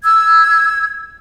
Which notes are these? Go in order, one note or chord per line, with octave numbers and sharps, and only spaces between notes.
E6 G#6